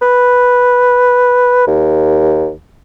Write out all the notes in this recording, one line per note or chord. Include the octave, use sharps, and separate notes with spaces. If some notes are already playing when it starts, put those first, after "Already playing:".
B4
D#2